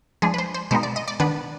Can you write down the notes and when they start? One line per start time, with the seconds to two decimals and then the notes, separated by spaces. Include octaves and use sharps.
0.22 F3 G#3 D4 G#4
0.34 B4
0.38 C5
0.54 C5
0.71 B2 G#3 B3 D#4 C5
0.83 D5
0.96 D#5
1.08 D5
1.20 D#3 B3 D4 B4